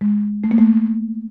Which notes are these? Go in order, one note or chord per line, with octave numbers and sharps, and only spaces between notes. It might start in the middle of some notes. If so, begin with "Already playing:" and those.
G#3
A3
A#3
A3